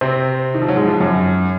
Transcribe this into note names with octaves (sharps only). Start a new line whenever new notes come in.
C3 C4
D#3
F3
F#3
G#2 G#3
F3
F#2 F#3